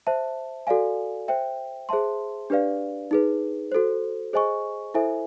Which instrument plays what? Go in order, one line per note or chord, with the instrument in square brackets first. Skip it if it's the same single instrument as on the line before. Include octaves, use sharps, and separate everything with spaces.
[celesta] C5 E5 A5
F#4 A4 D5 F5 G#5
C5 E5 G5
G#4 C5 E5 A5 C6
D4 G4 B4 D5 F5
D#4 G#4 B4
F#4 A4 C5
G#4 C5 D#5 G#5 C#6
E4 A4 C5 E5 G#5